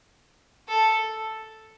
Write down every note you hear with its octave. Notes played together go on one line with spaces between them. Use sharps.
A4